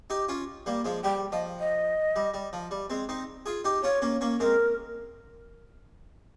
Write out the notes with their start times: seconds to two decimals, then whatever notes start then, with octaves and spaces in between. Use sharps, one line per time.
0.10 D#4 G4
0.29 C#4 F4
0.66 G3 A#3
0.85 F3 G#3
1.04 G3 G5
1.31 F3 D#5
1.60 D#5
2.16 G3
2.34 G3
2.53 F3
2.71 G3
2.90 G#3 C4
3.09 C4 D#4
3.46 F4 G#4
3.64 D#4 G4
3.83 C#4 F4 C#5
4.02 A#3 C#4
4.21 A#3 C#4
4.40 G#3 C4 A#4